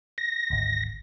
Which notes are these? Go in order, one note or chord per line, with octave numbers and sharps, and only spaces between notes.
A#6
G#1 D2